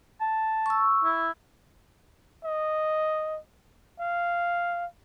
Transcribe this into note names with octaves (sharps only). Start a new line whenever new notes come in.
A5
C#6 E6
E4
D#5
F5